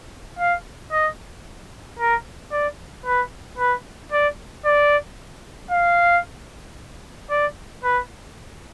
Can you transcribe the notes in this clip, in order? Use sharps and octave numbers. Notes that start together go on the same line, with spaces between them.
F5
D#5
A#4
D5
B4
B4
D5
D5
F5
D5
B4